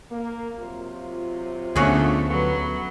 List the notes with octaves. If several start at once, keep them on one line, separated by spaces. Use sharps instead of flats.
A#3
C3 F#3 F4
D2 D3 A3 B3 C#4 F#4 G#4
F#3 B4